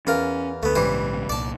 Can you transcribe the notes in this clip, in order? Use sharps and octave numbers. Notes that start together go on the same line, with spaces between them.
E2 C#4 F4 A#4
D2 A3 B3
A#1 G#2 C#3 E3 G3 C5
C2 A#2 D5 A5